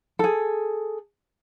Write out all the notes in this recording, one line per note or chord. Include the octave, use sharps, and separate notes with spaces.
G#4 A4